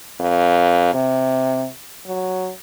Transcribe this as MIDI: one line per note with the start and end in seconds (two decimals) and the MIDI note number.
0.20 0.90 41
0.94 1.66 48
2.07 2.51 54